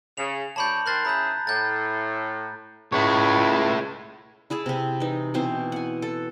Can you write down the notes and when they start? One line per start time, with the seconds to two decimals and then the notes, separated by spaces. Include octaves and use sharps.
0.18 C#3 F7
0.56 D2 C#5 D5 A5 B5 G6
0.86 D#3 A#4 C5 B5 F#6 A6
1.05 C#3 E4 G#4 A#5 G6
1.47 A2 G6 A6
2.92 C#2 E4 C#5
4.50 E4 G#4 A5 B5
4.66 C3 C4
5.00 E3 D#4
5.34 B2 E3 C4 C5
5.72 F#5 G#5
6.02 A4